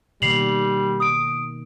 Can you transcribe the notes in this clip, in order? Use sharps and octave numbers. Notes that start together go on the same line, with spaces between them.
B2 D#3 G3 A#3 C7 F7 F#7
D#6 D7